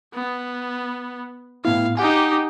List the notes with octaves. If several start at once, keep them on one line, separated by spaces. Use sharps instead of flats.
B3
A2 B3 E4 F5
D#4 G4 F#5 G#5